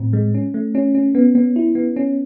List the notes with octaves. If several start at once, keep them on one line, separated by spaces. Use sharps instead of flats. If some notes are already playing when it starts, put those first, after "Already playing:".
Already playing: A2 C4
G#3
C#4
A3
C#4
C#4
B3
B3
E4
B3
C#4